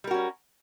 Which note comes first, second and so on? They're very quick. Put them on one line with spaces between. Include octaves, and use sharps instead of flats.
G3 A#4 F#4 C#4